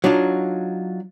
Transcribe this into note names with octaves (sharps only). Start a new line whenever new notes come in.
F#3 D4 D#4 F4